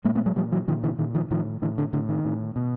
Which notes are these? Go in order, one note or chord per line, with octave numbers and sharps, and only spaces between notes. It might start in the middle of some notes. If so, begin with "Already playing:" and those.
A#2 G#3 A#3
A3 B3
F#3 G#3
A#2 F3 G3
E3 F#3
A#2 D#3 F3
D3 E3
A#2 D#3
D#3 F3
A2 D#3 F3
A2 D3 E3
D3
A2 D3
D#3
A2
B2